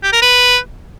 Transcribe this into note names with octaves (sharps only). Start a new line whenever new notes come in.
G4
A#4
B4